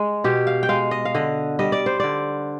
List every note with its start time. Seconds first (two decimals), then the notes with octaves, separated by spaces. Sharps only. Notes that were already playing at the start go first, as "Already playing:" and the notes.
Already playing: G#3
0.24 B2 G4
0.47 F5
0.63 G5
0.69 G#3 F5
0.91 D#5
1.05 F5
1.15 D3 D#5
1.59 G3 D#5
1.72 D5
1.86 C5
2.00 D3 D5